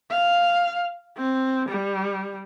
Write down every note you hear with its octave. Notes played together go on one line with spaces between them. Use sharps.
F5
C4
G3